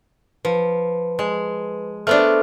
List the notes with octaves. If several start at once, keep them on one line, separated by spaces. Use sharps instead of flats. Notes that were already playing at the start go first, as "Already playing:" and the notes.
F3 B4
G#3
A3 B3 D4 C5 E5 F6